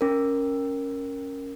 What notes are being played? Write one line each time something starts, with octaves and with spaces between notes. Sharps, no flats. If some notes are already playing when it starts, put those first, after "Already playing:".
C#4 A#4